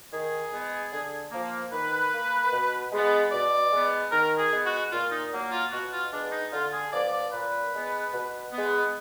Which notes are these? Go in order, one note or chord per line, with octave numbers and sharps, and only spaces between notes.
D#3 G#4
G#3 B3
D3
F3 A#3
D#3 B4
A#3
B2
G#3 B3
B2 D5
G#3 B3
D#3 A#4
G#4
G#3 B3
F#4
A#2 F4
D#4
F#3 A#3
F4
B2 F#4
F4
G#3 B3 D4
D#4
D3 F4
G#4
F3 B3 D5
D5
A#2 B4
G#3 B3
B2
G#3 B3